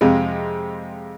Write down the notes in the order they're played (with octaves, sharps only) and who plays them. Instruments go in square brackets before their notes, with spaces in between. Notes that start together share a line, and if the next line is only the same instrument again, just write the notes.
[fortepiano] F2 C3 G#3